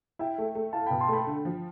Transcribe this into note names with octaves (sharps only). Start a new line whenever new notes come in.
E4 E5 G5
A3
A3
E4 F5 A5
B2 G5 B5
A5 C6
A3 G5 B5
D3
F3